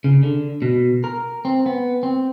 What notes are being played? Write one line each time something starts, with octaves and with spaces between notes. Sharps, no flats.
C#3
D3
B2
A#4
C4
B3
C4